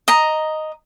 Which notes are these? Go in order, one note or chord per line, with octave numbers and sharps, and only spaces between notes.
D#5 A#5